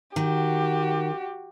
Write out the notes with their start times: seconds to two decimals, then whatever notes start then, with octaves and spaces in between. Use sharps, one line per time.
0.16 D#3 F#4 G4